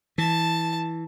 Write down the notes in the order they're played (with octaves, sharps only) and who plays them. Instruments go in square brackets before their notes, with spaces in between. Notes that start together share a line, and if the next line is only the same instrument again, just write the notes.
[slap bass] E3 [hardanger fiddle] A5